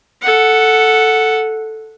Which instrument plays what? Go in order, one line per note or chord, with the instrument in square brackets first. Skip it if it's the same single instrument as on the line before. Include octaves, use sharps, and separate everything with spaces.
[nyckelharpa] A4 F#5